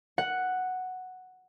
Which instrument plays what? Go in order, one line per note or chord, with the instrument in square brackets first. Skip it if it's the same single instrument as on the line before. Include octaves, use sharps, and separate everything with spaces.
[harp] F#5